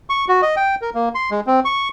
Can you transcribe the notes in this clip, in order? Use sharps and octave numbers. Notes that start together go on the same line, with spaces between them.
C#6
F#4
D#5
G5
A#4
A#3
C6
G#3
C4
C#6